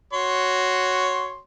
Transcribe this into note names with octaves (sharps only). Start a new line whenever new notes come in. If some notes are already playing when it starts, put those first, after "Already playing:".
F#4 C#5 C6